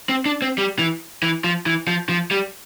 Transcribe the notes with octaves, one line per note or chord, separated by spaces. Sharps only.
C4
D4
C4
G3
E3
E3
F3
E3
F3
F3
G3